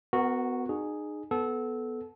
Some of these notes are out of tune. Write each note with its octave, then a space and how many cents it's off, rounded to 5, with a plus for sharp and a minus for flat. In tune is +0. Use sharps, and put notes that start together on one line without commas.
B3 +25 F#4 -5 A#4 -10
D#4 -35 G#4 +0
B3 +0 A4 -20